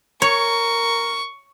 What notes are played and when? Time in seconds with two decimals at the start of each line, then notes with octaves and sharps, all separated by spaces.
0.22 A#4 C#5 C#6